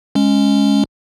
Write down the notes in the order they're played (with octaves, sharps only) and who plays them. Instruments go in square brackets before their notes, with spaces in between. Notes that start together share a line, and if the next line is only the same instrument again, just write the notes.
[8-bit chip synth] G#3 C#4